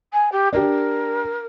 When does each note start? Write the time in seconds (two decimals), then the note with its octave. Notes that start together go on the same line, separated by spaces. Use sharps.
0.13 G#5
0.32 G4
0.53 D4 G4 A#4